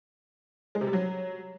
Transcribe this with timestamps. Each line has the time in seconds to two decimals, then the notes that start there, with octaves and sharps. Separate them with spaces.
0.75 G#3
0.81 C3
0.87 G3
0.93 F#3